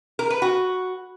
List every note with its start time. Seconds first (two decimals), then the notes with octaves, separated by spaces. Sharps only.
0.19 A#4
0.30 B4
0.42 F#4